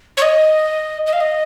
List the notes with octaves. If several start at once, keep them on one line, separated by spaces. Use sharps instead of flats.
C#5
D#5
D#5
F5
D#5